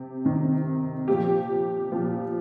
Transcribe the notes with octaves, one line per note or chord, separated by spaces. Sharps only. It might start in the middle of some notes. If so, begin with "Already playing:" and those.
Already playing: C3 G4
C3 D#3
A#2 F3 G4
A#2 F3